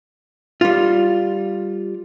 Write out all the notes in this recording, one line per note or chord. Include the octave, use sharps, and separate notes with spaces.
G3 F4